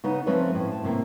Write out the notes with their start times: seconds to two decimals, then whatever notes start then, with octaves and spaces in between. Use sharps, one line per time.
0.04 C#3 B3 D#4
0.26 F3 A3 C4 C#4 B4 C#5
0.55 A2
0.72 A5
0.83 A2 C3 A#3